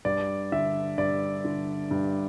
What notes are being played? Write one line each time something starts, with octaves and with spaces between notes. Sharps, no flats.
G2 D5
D3 E5
G2 D5
D3
G2